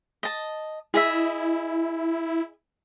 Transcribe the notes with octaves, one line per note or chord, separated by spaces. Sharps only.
D#5 A5
E4 G#4 D#5 E5